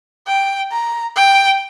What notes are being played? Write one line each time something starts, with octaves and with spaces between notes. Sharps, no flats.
G5
A#5
G5